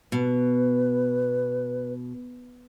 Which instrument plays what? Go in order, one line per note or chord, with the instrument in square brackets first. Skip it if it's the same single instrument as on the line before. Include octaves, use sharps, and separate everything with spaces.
[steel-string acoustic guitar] B2 [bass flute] B4